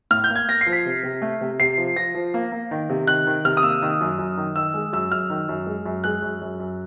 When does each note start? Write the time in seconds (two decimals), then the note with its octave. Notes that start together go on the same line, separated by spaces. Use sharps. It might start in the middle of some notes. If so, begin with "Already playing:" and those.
0.11 A2 F6
0.24 G6
0.30 A#3
0.35 G#6
0.48 A#3 A#6
0.61 C7
0.66 F3
0.73 B6
0.86 C3
1.03 C3
1.22 A3
1.41 C3
1.60 C3 C7
1.78 F3
1.96 F3 A#6
2.15 F3
2.34 A#3
2.52 A#3
2.71 D#3
2.89 C3
3.07 D#3 F#6
3.27 D#3
3.45 C3 F6
3.57 D#6
3.63 A#3 E6
3.82 D#3
4.01 F#2
4.19 F#2
4.37 D#3
4.56 D#3 E6
4.74 G#3
4.93 F#2 E6
5.12 F#2 F6
5.30 D#3
5.49 F#2
5.67 G#3
5.86 F#2
6.04 G#3 F#6
6.22 F#2
6.41 F#2
6.60 F#2